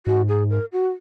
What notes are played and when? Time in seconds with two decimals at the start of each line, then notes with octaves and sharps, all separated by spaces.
0.06 G#2 F#4
0.28 G#4
0.50 A#4
0.72 F#4